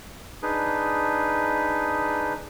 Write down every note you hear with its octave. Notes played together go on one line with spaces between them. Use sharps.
D4 D#4 G#4 B4